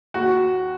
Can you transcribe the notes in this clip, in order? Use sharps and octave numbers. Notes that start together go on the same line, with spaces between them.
D#2 F#4